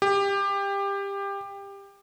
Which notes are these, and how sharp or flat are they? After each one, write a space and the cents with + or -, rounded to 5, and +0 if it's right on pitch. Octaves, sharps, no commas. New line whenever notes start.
G4 +20